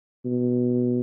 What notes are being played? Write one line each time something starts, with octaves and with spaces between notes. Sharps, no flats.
B2